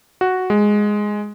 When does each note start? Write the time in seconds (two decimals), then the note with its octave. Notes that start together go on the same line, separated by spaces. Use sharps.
0.21 F#4
0.50 G#3